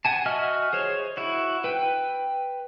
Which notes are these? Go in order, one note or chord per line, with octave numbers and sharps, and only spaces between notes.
F#5 G#5 A5
F#4 D#5 E5 G#5 F6
G#4 C5 C#5
E4 F#4
B4 G5